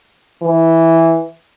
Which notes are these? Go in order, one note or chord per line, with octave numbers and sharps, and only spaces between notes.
E3